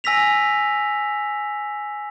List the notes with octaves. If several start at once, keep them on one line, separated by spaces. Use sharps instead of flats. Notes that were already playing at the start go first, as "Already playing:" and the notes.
G#5 E6 A#6 B6 F7